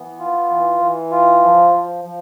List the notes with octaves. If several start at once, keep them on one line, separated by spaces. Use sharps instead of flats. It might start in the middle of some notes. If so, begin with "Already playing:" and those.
Already playing: E3 B3
F4
E3
E3
F4
F3
F3
F3